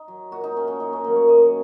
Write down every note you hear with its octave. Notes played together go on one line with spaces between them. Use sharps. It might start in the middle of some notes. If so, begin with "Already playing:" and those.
Already playing: D#4
F#3
A#2 F#4
D#4
F#3 C#4
C#4
F#2 D#4
C#4
D#3 F#3 A#3
C#5
F#2 D#5